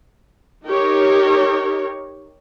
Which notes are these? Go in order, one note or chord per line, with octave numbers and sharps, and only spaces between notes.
D#4 G4 A#4 C#5